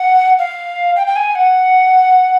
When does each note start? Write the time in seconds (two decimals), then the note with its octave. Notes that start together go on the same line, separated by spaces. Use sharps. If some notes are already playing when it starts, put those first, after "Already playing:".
Already playing: F#5
0.39 F5
0.96 G5
1.07 G5
1.16 G#5
1.35 F#5